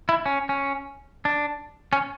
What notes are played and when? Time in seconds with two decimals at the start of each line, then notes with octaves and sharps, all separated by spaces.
0.09 E4
0.26 C#4
0.49 C#4
1.25 D4
1.93 C#4